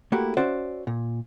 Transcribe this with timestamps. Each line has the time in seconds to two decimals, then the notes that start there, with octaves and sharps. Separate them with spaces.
0.12 A3 A#3 E4 F#4 G4
0.37 C#4 F#4 C5 D5 E5
0.87 A#2